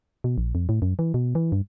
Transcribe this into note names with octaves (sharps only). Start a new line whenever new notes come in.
B2
A#1
F2
A2
F#2
E3
B2
E3
G2